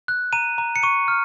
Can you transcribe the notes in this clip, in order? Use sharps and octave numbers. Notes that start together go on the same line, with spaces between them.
F#6
A#5 D#7
A#5
C#7
C#6 D#7
F6